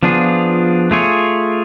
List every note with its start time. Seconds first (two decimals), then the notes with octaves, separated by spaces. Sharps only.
0.03 F3 B3 D4 F4 G#4
0.91 A3 F4 G#4 C#5